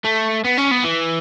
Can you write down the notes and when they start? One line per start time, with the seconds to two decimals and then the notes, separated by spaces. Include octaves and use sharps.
0.04 A3
0.44 B3
0.58 C#4
0.71 B3
0.84 E3